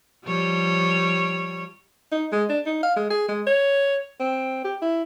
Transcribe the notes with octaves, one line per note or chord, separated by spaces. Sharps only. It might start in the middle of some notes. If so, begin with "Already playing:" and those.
F3 G3 C#5
D#4
G#3
D4
D#4
F5
G#3
G#4
G#3
C#5
C4
G4
E4